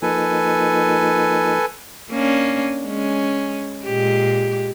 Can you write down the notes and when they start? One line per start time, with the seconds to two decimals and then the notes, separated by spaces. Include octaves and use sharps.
0.02 F3 A#3 D#4 A4 B4 G#5
2.11 A#3 C#4 D4
2.84 G#3 C#4
3.85 A#2 G#3 G4